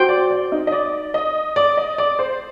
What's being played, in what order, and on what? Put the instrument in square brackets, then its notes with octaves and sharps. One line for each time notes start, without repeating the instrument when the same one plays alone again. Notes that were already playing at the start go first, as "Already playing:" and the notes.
Already playing: [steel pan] F#4 C5 G5
[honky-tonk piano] D5
D5
D#4
D#5
D5
D#5
D5
D#5
D5
C5